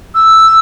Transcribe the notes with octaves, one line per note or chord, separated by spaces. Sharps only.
E6